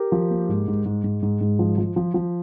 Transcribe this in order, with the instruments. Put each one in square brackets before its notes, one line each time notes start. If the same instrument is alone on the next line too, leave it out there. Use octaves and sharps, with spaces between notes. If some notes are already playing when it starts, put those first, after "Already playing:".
Already playing: [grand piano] G4 A#4
F3
A#3
G#2
G#2
G#2
G#2
G#2
G#2
F3
F3
F3
F3